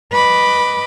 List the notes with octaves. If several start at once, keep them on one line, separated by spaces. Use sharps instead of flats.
B4 D#5 B5 D6